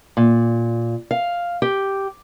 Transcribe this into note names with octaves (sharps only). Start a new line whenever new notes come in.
A#2
F5
G4